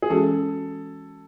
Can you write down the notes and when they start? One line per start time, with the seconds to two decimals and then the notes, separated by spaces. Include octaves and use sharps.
0.02 G#4
0.10 E3 G#3 C#4 F#4 A4